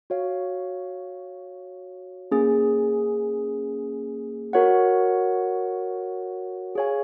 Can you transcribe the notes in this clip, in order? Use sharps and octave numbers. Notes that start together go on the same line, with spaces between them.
F#4 C#5 F5
A#3 C#4 G#4
F#4 A#4 C#5 F#5
G#4 C#5 F5 G#5